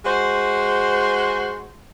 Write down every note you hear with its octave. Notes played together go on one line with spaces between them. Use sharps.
G#3 F#4 C5